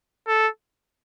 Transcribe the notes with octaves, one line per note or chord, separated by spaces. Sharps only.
A4